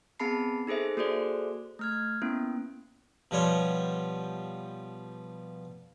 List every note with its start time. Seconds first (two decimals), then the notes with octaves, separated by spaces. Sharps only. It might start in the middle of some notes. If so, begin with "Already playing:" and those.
0.20 B3 C4 G#4 A5 B5 C7
0.67 D#4 G#4 A4 C5 E5
0.97 A#3 F#4 G#4 A4 C5 D5
1.79 A3 F6 G#6
2.22 A#3 B3 C#4 E4
3.31 B2 F3 G3 C#5